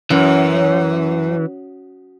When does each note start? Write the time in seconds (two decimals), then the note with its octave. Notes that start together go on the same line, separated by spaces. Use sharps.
0.10 F#2 E3